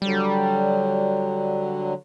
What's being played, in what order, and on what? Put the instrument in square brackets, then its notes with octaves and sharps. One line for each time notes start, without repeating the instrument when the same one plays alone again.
[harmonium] D3 F#3 [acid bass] G3